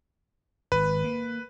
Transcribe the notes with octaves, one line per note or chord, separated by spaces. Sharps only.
G#1 B4
A#3